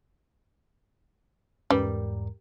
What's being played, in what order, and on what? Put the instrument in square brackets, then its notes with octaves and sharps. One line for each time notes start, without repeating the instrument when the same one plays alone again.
[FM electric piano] E2 G#2 A#4 [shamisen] G3 [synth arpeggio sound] C#4 B4